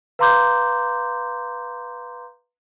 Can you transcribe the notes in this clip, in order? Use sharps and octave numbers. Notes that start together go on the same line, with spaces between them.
B4 F5 A#5 C6 D6 G6